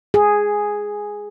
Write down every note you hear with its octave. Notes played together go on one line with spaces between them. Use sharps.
G#4